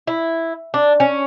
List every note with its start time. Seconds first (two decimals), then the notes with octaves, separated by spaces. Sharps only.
0.07 E4
0.74 D4
1.00 C#4